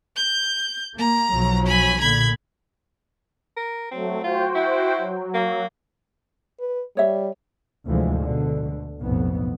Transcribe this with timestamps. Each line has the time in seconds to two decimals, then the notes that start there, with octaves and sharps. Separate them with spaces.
0.16 G6
0.98 A#3 A#5
1.32 B1 F3 F#3
1.66 G#5 B5
2.00 A#2 D3 B5 G#6
3.57 A#4
3.91 F#3 A3 C4
4.24 F4 F#4 C5 G5
4.55 E4
4.97 F#3
5.34 A#3
6.59 B4
6.97 G3 C#5 E5
7.86 D2 G#2 C3 E3 F3 G#3
8.20 D2 B2 D3
8.99 B1 F2 A2 B3